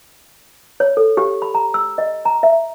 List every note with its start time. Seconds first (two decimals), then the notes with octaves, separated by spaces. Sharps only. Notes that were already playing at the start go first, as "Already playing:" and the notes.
0.80 C#5
0.97 A4
1.17 G4
1.42 B5
1.54 A#5
1.74 E6
1.98 D#5
2.25 A#5
2.43 E5